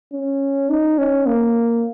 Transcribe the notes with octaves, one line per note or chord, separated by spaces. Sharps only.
C#4
D#4
C#4
A#3